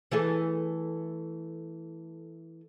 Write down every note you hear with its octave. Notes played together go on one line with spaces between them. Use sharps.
E3 A3 G#4